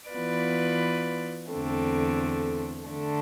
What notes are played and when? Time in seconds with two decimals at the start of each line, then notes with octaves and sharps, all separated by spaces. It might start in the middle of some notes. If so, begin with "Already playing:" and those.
0.11 E3 B3 F4 B4 D5
1.51 E2 D3 A3 C4
2.90 D3 A3 D4